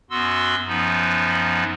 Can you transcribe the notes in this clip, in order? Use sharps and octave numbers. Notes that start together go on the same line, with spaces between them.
F#2 B3 F#4 C6 E6
F#2 F3 B3 D#4